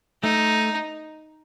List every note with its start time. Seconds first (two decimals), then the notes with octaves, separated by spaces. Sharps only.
0.23 A3 D#4